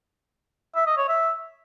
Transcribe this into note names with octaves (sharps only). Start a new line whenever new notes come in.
E5
D#5
C#5
E5